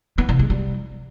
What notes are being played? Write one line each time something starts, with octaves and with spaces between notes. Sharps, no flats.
B3
C3
G#3
G3